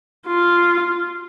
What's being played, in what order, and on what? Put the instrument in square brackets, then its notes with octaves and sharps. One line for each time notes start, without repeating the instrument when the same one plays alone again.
[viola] F4